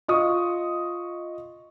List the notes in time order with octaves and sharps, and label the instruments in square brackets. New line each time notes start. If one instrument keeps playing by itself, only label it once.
[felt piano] F4 D#5 C#6 D#6